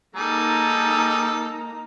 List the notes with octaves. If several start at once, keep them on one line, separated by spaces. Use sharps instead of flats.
G3 A#3 D#4 G#4 A4 A#5